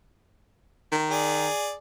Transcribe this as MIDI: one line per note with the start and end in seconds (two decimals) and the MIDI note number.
0.92 1.48 51
1.10 1.75 68
1.10 1.75 74